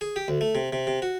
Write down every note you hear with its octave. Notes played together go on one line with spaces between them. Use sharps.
G#4
G4
D2
A3
C3
C3
C3
F#4